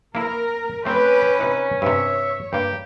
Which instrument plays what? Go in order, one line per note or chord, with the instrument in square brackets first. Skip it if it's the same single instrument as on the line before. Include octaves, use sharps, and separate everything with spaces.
[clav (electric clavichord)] A#3 E4 [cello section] A#4
[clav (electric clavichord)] A3 C4 [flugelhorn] C#4 [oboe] G4 [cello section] B4
[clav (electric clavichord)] C3 D#4 E4
[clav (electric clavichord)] G2 C3 [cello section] C#5 [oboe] E5
[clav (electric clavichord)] G2 A#3 [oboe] G4